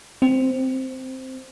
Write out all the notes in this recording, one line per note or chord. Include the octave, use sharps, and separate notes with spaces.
C4